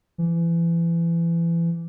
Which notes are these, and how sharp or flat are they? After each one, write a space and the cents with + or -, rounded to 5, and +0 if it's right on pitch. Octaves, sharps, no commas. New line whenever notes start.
E3 +30